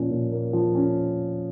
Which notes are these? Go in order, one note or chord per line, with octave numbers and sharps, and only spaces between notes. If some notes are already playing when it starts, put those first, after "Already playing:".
Already playing: A#2 F3 A#3 C#4
A#2
A#3
F3
C#4